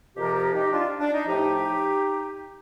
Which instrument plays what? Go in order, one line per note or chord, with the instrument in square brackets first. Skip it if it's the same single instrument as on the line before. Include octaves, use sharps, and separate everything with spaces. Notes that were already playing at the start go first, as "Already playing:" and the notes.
[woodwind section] F2 C3 F3 G4 A#4
G4 A#4
D#4 G4
D4 F4
D4
D#4
A2 F3 D#4 G4